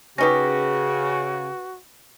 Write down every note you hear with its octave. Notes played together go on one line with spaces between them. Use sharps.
C#3 C#4 D#4 F#4 G4 B4 A#6